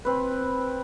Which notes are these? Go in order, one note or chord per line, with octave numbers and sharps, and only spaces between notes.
C4 B4